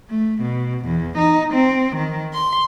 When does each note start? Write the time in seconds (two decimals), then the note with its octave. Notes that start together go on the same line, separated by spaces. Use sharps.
0.11 A3
0.43 B2
0.86 E2
1.18 D#4
1.54 C4
1.97 D#3
2.33 C6